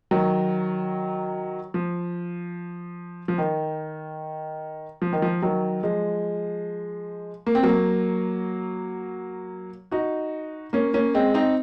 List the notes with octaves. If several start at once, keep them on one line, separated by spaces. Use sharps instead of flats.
D#3 F#3
F3
F3
D#3
F3
D#3
F3
D#3 F#3
F3 G#3
A#3
C4
F#3 A#3
D#4 F#4
A#3 C#4
A#3 C#4
G#3 C4
C4 D#4